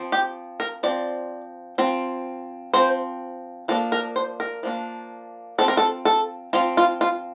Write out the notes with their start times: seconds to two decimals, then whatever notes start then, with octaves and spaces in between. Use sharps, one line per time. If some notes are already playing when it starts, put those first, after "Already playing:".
Already playing: F3 C4
0.12 G4
0.60 A#4
0.83 F3 C4 D5
1.78 F3 C4
2.73 F3 C4 C5
3.68 F3 A#3 D4 A4
3.92 A#4
4.16 C5
4.40 A#4
4.63 F3 A#3 D4
5.58 F3 C4 A4
5.68 A#4
5.77 A4
6.05 A4
6.53 F3 C4 F4
6.77 F4
7.01 F4